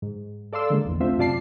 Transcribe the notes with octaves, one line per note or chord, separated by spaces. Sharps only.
G#2
A4 D5 F5 C6 E6
D3 G#3 A#3
A#1 E2
A3 C4 D4 F4 C5 E5
F#2 C3 F4 D5 A5 C7